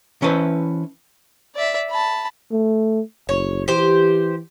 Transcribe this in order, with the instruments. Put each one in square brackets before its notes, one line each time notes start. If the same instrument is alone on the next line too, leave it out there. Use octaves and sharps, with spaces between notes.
[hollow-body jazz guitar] E3 C#4 E4 A4 B4 C5
[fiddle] D5 E5
A5 B5
[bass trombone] A3
[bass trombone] F#1 [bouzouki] C#5
[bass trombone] E3 [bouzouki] G4 C5